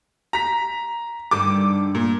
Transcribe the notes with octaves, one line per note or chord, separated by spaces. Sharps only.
A#5 B6
G2 D3 D#3 D6
A#2